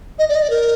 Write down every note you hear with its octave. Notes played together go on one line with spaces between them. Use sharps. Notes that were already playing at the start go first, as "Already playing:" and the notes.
D#5
D5
D#5
D5
A#4